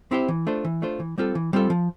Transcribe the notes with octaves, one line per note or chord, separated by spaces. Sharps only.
C4 E4 G4 C5
E3
A3 D4 F4 C5
E3
A3 D4 F4 C5
E3
G3 C4 F4 A4
E3
G3 C4 F4 A4
F3